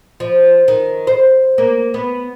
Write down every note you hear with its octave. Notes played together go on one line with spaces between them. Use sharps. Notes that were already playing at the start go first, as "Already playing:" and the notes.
F3
D#3
C5
A#3
B3